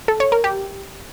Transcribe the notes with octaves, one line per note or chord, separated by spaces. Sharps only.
A4
C#5
A#4
G4